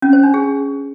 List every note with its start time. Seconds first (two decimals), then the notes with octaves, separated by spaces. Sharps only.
0.02 C#4
0.13 C5
0.23 D4
0.34 G#4